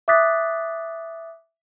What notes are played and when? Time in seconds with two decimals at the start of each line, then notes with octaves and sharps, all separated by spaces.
0.08 E5 D6 D#6 F#6 A6 B6